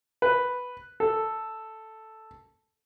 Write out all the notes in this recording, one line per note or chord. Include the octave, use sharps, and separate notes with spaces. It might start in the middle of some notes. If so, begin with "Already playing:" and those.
B4
A4